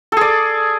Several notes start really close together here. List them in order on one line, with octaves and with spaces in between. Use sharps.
A4 G#4 D5